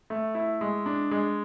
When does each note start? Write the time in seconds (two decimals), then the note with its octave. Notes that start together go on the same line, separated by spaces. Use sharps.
0.10 A3
0.35 E4
0.61 G#3
0.86 D4
1.11 G#3